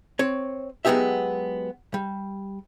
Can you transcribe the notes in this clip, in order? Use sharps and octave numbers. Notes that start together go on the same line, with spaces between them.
C4 C#5
F#3 G#3 B3 D#4 G4 E5
G3